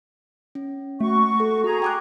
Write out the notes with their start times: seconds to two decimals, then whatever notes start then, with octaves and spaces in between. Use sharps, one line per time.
0.55 C#4
1.01 A3 F#4 C#6
1.40 A4
1.64 F#4 G#4 A#5
1.82 G5 D6 F#6